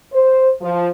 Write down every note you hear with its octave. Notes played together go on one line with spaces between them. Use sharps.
C5
F3